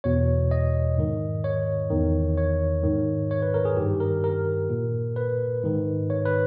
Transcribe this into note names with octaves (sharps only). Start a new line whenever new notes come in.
E2 B2 C#5
D#5
G#2 D#3
C#5
E2 D#3
C#5
G#2 D#3
C#5
B4
A#4
G#4
G2 D#3 G4
A#4
A#4
A#2
B4
G#2 D#3
C#5
B4